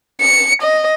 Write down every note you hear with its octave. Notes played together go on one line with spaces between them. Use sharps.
C#7
D#5